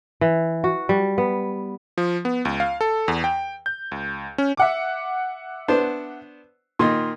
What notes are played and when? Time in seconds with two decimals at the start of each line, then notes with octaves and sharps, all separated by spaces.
0.21 E3
0.64 F#4
0.89 G3
1.18 B3
1.98 F3
2.25 B3
2.45 C#2
2.60 F5
2.81 A4
3.08 E2
3.24 G5
3.66 G6
3.92 C#2
4.38 C#4
4.57 E5 F#5 D6
5.68 B3 D4 C5
6.79 A#2 D#3 D#5 C6